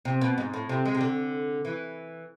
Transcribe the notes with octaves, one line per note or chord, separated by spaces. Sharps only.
C3
B2
G#2
A2
C3
G#3
C3
D3
E3